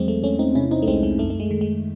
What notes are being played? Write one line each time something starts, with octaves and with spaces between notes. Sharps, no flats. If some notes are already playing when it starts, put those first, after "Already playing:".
Already playing: E2 F#3 G#3 C4
A3
E2 A3 C#4
C4 D#4
C3 C#4 E4
C4 D#4
A3
C2 G#3 C4
G#3
F#2 A3
A3
G#3
D#3
G#3